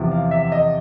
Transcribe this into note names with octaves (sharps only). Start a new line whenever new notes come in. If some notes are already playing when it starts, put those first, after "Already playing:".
Already playing: E2 C3 F3
F5
E5
D#5